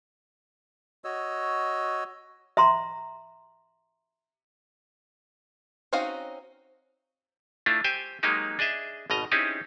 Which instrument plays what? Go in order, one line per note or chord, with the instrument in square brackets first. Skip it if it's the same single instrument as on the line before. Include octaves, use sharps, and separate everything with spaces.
[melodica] F#4 C#5 D#5 E6
[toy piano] E5 A#5 C6
[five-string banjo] C4 C#4 D#4 F#4 F5
[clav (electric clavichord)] A3 D4 E4 F4
G4 C5 G5 G#5
F#3 G#3 A#3 D#4 G4
D4 G#4 D#5 E5
G#1 B2 D#5 A#5
C4 C#4 D#4 E4 G4 G#4